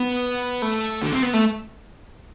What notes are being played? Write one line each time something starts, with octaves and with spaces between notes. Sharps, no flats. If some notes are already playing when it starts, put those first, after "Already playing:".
Already playing: B3
A3
D3
C4
B3
A3